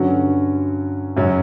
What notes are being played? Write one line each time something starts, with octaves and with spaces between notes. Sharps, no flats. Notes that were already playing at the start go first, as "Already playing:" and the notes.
Already playing: G2 D3 F#3 C#4 F#4
F#2 C#3 F#3 C#4